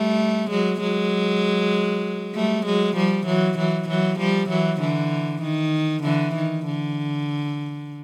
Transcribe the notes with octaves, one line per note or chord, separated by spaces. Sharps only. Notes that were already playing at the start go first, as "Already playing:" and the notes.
Already playing: G3 A3
F#3 G#3
F#3 G#3
G3 A3
F#3 G#3
F3 G3
E3 F#3
E3 F#3
E3 F#3
F3 G3
E3 F#3
D3 E3
D#3
D3 E3
D#3
D3